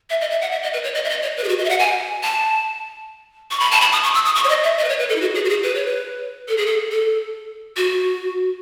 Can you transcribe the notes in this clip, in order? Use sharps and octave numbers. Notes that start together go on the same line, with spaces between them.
E5
D#5
E5
F#5
E5
D#5
B4
C#5
D#5
E5
D#5
C#5
B4
G#4
F#4
D#5
E5
F#5
G#5
A5
C#6
B5
A5
B5
D#6
C#6
E6
D#6
C#6
C#5
D#5
E5
D#5
B4
C#5
B4
A4
E4
F#4
G#4
F#4
G#4
B4
C#5
B4
A4
G#4
A4
A4
F#4